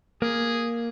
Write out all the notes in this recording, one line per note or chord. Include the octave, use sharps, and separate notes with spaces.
A#3 G#4